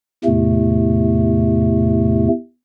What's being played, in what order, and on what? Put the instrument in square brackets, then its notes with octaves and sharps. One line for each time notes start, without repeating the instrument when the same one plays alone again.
[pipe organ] E2 A2 C3 A3